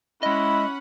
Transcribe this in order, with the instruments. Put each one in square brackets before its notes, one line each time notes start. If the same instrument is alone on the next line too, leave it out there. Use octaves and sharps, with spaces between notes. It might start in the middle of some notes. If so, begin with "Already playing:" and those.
[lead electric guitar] G#3 D#5 [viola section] C#4 F#5 B5 [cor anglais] E4